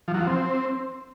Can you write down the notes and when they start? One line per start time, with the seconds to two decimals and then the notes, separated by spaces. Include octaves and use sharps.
0.08 F3
0.14 F#3
0.21 F3
0.27 C4